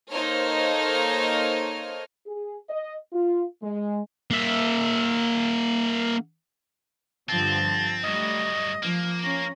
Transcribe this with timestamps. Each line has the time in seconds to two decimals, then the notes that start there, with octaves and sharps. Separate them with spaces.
0.10 A#3 D#4 A4 C5 C#5 F6
2.27 G#4
2.69 D#5
3.13 F4
3.63 G#3
4.31 A#3 E5
7.29 G2 D3 F3 C4 A5
8.04 G2 F#3 G3 A3 D#5
8.83 F3 A#3
9.22 C#4 A#5